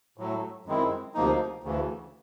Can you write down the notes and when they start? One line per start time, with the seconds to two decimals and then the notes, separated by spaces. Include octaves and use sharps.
0.18 A2 F#3 A3
0.66 F#2 D#3 G#3 C4 E4
1.14 D2 C3 F3 A#3 D#4
1.64 D2 C#3 E3